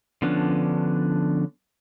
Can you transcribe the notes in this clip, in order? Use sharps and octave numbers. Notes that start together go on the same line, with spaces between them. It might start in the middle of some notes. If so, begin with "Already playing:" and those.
D3 F3 B3 C#4 D4